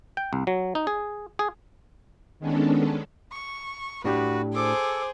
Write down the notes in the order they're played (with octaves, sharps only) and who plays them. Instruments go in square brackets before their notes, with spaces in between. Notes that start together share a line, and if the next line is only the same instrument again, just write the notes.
[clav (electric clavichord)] G5
C2
F#3
D#4
G#4
G#4
[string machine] D#3 G#3 B3 C#4 D4 A4
[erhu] C#6
[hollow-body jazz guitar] A2 D4 G4 [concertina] F#4 [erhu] B4
[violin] G#4 C5 [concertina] A4 [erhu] D6